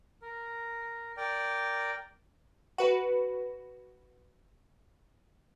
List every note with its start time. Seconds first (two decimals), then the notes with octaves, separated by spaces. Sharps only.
0.22 A#4
1.17 A#4 D5 G5
2.78 F#4 B4